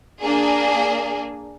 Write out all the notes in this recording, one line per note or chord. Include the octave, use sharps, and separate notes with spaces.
A#3 D4 G#4